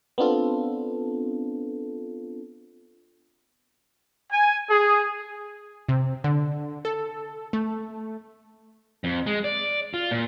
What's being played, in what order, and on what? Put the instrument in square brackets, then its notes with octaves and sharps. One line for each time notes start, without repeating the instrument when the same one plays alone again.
[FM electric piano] B3 C4 D4 F4 A4
[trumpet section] G#5
G#4
[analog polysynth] C3
D3
A4
A3
[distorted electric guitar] F2
G#3
D5
F4
A#2